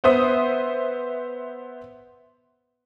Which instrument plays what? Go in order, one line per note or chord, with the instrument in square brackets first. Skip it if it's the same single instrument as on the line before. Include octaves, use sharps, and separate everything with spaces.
[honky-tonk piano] B3 C5 E5 D#6